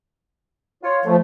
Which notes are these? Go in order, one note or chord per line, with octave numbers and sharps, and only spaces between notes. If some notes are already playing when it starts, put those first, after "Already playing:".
F4 C#5
F3 A3